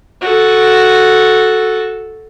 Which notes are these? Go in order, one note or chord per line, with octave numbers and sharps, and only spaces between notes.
F#4 A4